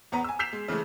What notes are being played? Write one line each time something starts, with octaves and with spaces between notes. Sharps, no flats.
E2 B3 B4 A#5
G#5 E6
E6 G6 B6 C7 E7 F7
G#3
C#3 E3 G#3 A3